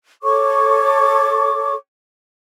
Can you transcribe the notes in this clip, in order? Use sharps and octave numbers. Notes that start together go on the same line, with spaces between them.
A4 C#5 C#6 D6